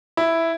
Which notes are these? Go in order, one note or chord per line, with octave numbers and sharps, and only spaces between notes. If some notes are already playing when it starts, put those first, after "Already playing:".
E4